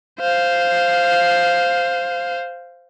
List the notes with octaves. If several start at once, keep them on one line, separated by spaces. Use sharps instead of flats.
C5 F5